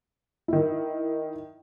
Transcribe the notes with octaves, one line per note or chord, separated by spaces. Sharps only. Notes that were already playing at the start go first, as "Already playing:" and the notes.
D#3 E4